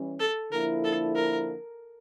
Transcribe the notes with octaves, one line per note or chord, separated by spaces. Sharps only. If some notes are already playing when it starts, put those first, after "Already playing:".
Already playing: E3 G3 C#4
A4
D3 F3 A#3 E4 A#4
A4
A#4